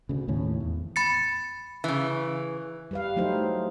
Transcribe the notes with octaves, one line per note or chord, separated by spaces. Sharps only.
D2 C#3
D#2 A2 C#4
E2
B5 A6 C#7
C#3 E3
G3 B4 F5
F#3 A3 D#4 E4 C5